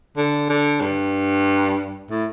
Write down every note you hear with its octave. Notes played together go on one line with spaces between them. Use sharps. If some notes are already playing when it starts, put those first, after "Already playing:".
D3
D3
G2
A2